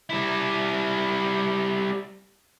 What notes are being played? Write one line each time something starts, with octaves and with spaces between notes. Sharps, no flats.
G3 E4